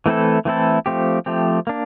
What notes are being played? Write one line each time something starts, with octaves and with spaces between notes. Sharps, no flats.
E3 A3 C4 E4 A4
E3 A3 C4 E4 A4
F3 A3 C4 G4
F3 A3 C4 G4
A#3 D4